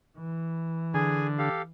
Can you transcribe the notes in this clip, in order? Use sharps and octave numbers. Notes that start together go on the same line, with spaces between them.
E3
D3 G#4 G#5
G4 A4 F5